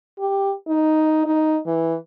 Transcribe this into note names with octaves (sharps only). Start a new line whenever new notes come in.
G4
D#4
D#4
E3